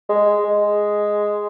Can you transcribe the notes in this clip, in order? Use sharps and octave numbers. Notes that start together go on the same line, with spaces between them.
G#3
G#3